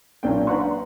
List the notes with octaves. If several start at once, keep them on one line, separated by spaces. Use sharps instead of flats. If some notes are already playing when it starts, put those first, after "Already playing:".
B1 A#2 C#4 D4 G5
D4 B4 F#5 A#5 C6 C#6
F#5